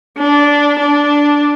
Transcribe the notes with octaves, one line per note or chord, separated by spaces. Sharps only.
D4
D4